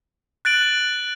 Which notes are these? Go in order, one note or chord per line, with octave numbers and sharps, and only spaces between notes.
F#6 A6 D7 F#7